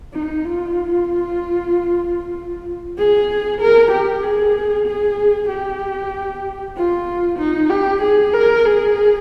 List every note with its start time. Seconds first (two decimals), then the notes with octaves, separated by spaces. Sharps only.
0.13 D#4
0.44 F4
2.97 G#4
3.61 A#4
3.91 G4
4.23 G#4
4.86 G#4
5.49 G4
6.76 F4
7.38 D#4
7.70 G4
8.02 G#4
8.33 A#4
8.65 G#4